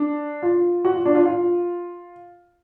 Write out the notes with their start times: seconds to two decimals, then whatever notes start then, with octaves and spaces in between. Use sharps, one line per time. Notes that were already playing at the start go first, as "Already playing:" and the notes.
Already playing: D4
0.43 F4
0.85 F#4
0.94 F4
1.05 D4
1.15 F4
1.26 F4